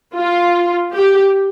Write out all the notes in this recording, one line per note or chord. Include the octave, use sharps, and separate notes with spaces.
F4
G4